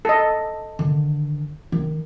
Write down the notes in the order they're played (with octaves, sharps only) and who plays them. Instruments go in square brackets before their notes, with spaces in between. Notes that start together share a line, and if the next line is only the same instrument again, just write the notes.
[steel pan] A4 D#5
[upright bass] D3 D#3
D#3